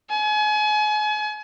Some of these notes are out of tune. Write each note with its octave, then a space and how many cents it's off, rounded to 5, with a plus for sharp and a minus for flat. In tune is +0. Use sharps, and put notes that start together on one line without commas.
G#5 +35